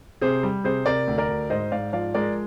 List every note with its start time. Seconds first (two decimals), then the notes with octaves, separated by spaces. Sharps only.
0.21 C3 G#4 C5
0.43 G3
0.64 C3 G#4 C5
0.86 C3 A#4 D5
1.08 D2
1.18 A#4 D5
1.28 D2
1.50 G#2 C5 D#5
1.72 G#2 D5 F5
1.93 F3 D5 F5
2.15 G#3 A#4 D5